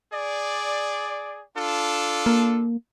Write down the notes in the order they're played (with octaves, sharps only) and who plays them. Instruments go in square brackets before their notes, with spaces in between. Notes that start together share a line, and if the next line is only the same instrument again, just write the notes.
[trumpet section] G#4 D5
D4 F4 A4
[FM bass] A#3